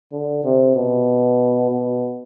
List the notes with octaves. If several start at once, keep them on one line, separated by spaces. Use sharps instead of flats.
D3
C3
B2
B2